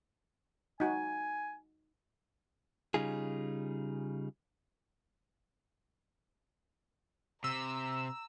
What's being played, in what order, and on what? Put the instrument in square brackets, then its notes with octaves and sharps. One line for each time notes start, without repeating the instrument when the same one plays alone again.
[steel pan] D#4 F#4 [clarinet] G#5
[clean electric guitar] C#3 G3 D#4 F4 G#4
[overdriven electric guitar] C3 [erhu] A#5 [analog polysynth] E6